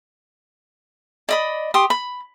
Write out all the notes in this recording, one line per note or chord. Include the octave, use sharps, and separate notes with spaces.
D5 D#5 B5
G4 C6 D#6
B5